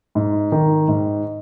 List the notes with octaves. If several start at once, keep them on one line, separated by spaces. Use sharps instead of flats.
G#2
D#3
G#2